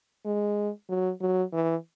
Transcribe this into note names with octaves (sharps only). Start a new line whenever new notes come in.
G#3
F#3
F#3
E3